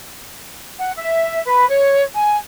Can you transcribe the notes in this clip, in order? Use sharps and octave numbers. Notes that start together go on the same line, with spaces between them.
F#5
E5
B4
C#5
G#5